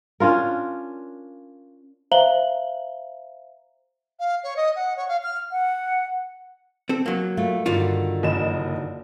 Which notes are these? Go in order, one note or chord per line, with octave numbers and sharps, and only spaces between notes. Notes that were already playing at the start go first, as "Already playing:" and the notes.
C#4 D4 F4 A#4
C5 E5 F5 A#5 F#7 G7
F5
C#5
D#5
F#5
C#5
F5
F6
F#5
C4 A4
F#3 A#3
G3 A3 F4
G2 D3 D#3 F4 F#4
F#1 D#5 E7